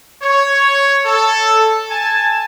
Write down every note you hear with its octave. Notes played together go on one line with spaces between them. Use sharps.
C#5
A4
G#5 A5